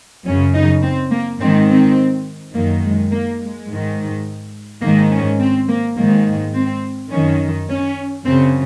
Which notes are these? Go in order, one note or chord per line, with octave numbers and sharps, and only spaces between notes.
F#2 C#3 C#4
D#4
C4
A#3
G#2 D#3 C4
C4
F#2 D#3 A#3
G#3
A#3
G#3
G#2 D#3
G#2 D#3 A#3
C#4
C4
A#3
G#2 D#3 A#3
C4
F#2 D#3 C#4
C#4
F#2 C#3 C4